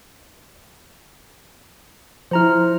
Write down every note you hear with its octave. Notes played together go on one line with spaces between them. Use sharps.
F3 E4 C5 A#5 F6